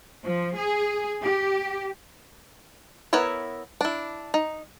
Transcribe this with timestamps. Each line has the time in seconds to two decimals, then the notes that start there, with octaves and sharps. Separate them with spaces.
0.24 F3
0.55 G#4
1.21 G4
3.13 B3 E4 A#4 C#5 E5
3.81 D4 E4
4.34 D#4